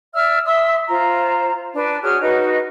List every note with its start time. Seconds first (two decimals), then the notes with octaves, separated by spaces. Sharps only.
0.13 D5 E5 E6 F6
0.44 E5 C6 D#6 E6
0.87 F4 C5 A#5
1.73 D4 B4 A5
2.02 F#4 G#4 C#5 F6
2.20 D#4 F#4 B4 D#5